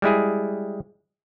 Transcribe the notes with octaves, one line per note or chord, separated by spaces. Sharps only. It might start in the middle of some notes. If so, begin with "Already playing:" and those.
G3 G#3 E4 G#4